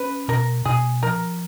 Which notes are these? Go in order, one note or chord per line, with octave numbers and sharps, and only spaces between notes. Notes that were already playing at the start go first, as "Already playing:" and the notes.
Already playing: C#4 B4
B2 A#4
B2 G#4
F3 A#4